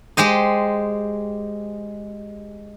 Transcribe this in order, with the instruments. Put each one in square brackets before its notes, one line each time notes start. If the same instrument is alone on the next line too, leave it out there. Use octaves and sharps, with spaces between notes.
[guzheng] G#3 G4 C5 D#5